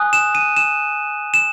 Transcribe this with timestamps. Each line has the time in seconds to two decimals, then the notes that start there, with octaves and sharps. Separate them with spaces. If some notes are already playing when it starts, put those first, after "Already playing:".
Already playing: G#5 D#6 F#6
0.13 E7
0.35 D#7
0.57 E7
1.34 E7